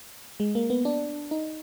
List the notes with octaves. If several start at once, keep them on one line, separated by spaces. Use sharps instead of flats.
G#3
A#3
B3
D4
D#4